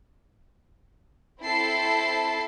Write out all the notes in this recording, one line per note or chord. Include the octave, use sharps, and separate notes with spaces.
C4 E4 A4 A5 C7